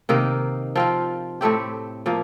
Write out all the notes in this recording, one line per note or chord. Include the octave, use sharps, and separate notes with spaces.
C3 D#3 A#3 D#4
F3 C4 F4
A2 A3 C4 G4
A#2 F3 A#3